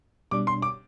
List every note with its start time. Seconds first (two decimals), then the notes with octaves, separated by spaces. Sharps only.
0.31 B2 G3 D4 D6
0.47 C6
0.62 D6